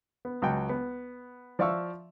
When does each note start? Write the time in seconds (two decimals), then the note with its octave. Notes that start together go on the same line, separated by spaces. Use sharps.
0.25 B3
0.42 C#2 F#3 G5 A5
0.69 B3
1.59 F3 D5 E5 F5 C#6 E6